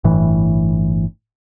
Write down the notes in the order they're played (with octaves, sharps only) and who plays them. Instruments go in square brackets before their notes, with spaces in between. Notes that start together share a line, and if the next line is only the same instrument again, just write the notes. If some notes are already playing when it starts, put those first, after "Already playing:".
[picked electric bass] G1 A2 E3